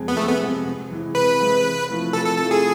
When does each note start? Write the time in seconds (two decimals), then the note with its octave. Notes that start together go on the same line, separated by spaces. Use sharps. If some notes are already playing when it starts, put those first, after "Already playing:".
Already playing: F2 C3 G#3 C4 G#4
0.08 B3
0.17 F2 A3
0.29 B3
0.40 C3 G#3 C4 G#4
0.66 C3
0.91 E3 G#3 C4 E4
1.15 C3 B4
1.40 E3 G#3 C4 E4
1.65 C3
1.89 F3 A3 E4
2.13 C3 A4
2.25 A4
2.38 F3 A3 E4 A4
2.51 G#4